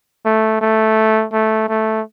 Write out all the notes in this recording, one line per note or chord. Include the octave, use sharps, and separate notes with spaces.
A3
A3
A3
A3